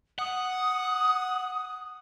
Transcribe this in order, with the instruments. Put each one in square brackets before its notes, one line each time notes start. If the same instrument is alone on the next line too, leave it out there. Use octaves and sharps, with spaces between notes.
[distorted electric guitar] F#5 [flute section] D#6